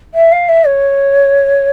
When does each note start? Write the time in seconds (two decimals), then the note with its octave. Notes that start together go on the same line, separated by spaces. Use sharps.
0.14 E5
0.32 F5
0.49 E5
0.66 C#5